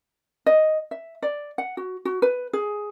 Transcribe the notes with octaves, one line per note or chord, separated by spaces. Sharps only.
D#5
E5
D5
F#5
F#4
F#4
B4
G#4